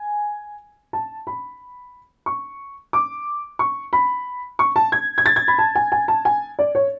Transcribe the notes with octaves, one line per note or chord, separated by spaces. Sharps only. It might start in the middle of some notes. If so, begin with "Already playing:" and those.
Already playing: G#5
A5
B5
C#6
D6
C#6
B5
C#6
A5
G#6
G#6
A6
G#6
B5
A5
G#5
G#5
A5
G#5
D5
C#5